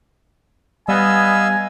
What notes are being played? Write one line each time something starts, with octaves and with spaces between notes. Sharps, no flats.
G3 B3 D#5 F5 G#5 E6